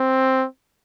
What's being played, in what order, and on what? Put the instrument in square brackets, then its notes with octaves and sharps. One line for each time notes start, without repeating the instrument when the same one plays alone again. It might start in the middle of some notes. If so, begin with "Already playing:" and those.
Already playing: [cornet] C4